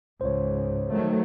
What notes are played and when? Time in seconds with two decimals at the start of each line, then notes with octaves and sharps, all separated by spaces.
0.21 C#2 G#2 C5 C#5
0.93 D#3 F#3 A3